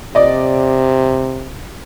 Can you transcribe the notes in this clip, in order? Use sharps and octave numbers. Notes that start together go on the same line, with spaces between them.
C3 D5 D#5